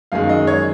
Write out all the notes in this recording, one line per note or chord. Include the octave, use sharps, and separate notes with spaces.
F#2 D#3 G#3 F5
D#5
C#5